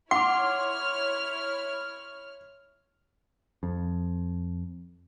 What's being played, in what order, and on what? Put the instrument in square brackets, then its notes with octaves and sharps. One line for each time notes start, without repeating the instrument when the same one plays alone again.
[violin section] E4 C#5 F6 [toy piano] F#5 [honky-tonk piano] C6 D6
[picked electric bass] F2